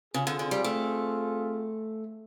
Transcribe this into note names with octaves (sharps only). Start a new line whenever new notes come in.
C#3 C4 F4 G#4
D3
D3
G3
A3